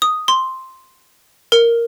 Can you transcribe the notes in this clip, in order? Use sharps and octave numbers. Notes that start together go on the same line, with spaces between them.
D#6
C6
A#4